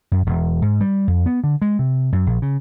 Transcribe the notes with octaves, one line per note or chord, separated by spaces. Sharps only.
F#2
E1
G#2
G3
F2
B3
D3
G#3
C3
F#2
A#1
C#3